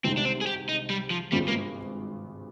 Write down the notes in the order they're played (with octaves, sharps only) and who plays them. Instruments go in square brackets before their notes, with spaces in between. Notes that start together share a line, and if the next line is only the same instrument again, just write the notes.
[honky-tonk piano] C2 C3 D#3 G#3 D#4 [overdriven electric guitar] C4
[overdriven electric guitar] D4
C4
G#4
G4
D#4
G3
F3
[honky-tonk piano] G#1 G2 F3 G#3 [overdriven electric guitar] G3
[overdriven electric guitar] A#3